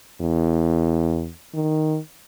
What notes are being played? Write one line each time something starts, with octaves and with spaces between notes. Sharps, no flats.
E2
D#3